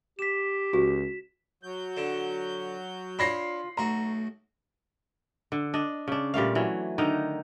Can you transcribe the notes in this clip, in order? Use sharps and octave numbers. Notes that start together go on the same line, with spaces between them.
G4 B6 E7
C#2 F#4
F#3 G6
D3
D4 F4 C#5 B5 A#6 C7
B1 A3 F#4 A#5
D3
D4 D#5
C#3 D4
A#2 G3 A3 F5
E3 F#3
D3 D#3 D#4